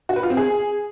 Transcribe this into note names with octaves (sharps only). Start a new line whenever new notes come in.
F#4
B4
F4
C4
G#4